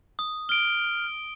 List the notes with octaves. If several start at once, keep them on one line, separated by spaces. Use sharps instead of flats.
D#6
F6 D7 G7